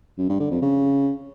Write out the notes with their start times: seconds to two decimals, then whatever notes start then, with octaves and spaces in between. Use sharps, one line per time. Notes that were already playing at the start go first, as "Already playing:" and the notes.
0.18 F#2
0.29 G2
0.40 D3
0.51 F2
0.62 C#3